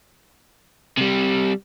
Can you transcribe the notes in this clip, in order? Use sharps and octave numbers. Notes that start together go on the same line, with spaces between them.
C3 G3